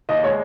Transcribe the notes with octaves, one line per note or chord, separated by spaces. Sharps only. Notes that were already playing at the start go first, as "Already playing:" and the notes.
D#2 D#5
G#3 C#5